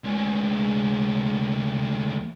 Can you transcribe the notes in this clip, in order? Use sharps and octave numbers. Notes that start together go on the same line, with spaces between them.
D2 G#3